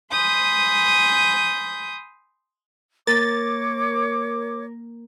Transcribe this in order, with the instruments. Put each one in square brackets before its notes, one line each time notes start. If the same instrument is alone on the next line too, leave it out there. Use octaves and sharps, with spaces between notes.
[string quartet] G#5 B5 C6 D#6 G6
[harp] A#3 [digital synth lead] A#4 [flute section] C#5 D6 [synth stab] A6